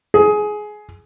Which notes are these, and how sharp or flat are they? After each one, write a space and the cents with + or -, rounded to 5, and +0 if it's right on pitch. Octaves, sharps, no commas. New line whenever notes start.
G#4 +15